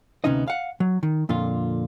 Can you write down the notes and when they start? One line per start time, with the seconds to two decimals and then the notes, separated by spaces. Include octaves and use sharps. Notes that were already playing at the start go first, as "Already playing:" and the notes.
0.24 D2 C3 B3 C#4 D#4 D#5
0.48 F5 F#5
0.80 F#3
1.03 D#3
1.29 F2 A#2 D3 F4